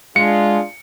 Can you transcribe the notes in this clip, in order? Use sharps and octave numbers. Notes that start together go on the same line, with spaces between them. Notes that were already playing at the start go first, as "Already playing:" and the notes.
G#3 D4 F4 G#4 C#7